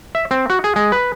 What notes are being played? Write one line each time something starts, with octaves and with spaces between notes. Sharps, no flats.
E5
C4
F#4
G#4
G#3
B4